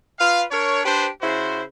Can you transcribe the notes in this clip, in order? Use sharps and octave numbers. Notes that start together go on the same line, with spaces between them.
F4 B4 F5
D4 A#4 C#5
D4 G4 B4 C5
C#3 E4 F#4 C5